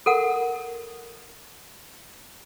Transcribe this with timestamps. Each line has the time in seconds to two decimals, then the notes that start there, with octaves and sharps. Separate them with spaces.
0.06 A4 A#4 F#5